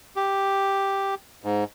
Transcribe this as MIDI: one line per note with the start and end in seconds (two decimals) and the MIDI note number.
0.16 1.15 67
1.44 1.64 44